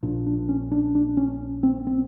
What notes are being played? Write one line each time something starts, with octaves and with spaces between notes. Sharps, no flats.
A#1 A#2 D4
D4
C#4
D4
D4
C#4
C4
C4